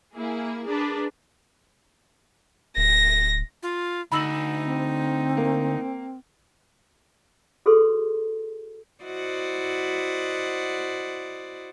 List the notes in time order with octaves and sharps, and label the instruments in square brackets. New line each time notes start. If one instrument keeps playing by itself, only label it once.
[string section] A#3 E4 G#4
D4 G#4 A#4 B4
[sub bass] D1 [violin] A#6
[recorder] F4
[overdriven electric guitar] D2 [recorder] D#4 [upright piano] B5 E6 F#7
[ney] C4
[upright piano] A#3
[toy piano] F#4 G#4 A4 B4 C6
[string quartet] E4 F#4 C5 D5 D#5 F#5